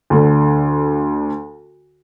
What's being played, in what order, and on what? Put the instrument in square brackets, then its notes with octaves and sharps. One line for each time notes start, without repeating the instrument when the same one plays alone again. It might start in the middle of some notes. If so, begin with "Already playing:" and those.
[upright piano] D2 D3